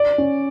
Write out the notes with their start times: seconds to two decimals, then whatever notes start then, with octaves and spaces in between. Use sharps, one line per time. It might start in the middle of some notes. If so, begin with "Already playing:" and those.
Already playing: D5
0.18 C#4